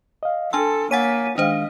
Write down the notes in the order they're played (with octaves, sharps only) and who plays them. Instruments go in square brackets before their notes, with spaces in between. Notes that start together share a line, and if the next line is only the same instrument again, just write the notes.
[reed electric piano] D#5 F5
[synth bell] D4 E6 [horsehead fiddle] A4 [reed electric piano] G#5 A5 C6
[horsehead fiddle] A#3 [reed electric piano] C#5 G#5 A6 [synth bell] F#5 B6 D#7
[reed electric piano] D#3 G#3 F5 [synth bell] D4 C5 [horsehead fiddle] D#5